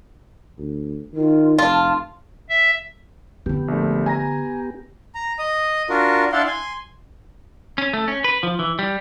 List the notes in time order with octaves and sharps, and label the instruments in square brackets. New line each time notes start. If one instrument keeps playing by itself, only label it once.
[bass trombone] D2
[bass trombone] D#3 [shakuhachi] F4
[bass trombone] F1 [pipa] F4 [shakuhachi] A5
[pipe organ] E5
[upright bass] E2 D3 [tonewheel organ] B3 G4
[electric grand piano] A#1 A3
G#5 A#5 A#6
[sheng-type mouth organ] A#5
D#5 D#6
D4 F4 F#4 A#4
D4 E4 D5 F5 F#5 C6
G#5 C6
[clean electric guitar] C#4
A3
C#4
B4
F3
E3
G3